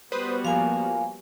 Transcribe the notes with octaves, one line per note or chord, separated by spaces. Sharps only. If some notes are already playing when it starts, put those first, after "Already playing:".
G3 B3 F#4 B4 C5 D#6
F3 A#3 F5 G#5